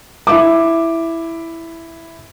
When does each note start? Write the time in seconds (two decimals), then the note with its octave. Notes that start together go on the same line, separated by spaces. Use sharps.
0.27 E4 E5 D6